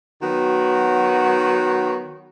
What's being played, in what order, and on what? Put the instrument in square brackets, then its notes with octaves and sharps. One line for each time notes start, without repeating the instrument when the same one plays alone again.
[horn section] D#3 F#3 B3 F#4